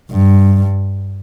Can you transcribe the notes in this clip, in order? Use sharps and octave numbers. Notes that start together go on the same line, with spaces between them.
G2